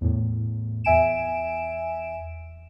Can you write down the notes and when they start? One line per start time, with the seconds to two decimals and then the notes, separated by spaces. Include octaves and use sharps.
0.01 E2 A2
0.84 E2 E5 G#5 D7 E7